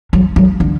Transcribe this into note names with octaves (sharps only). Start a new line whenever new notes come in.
F#3
F#3
D3